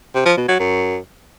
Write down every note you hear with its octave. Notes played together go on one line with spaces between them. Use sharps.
C3
F3
B2
F#3
F#2